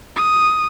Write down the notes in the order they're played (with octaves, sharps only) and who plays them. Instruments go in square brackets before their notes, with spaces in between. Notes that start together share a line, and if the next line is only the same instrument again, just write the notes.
[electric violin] D#6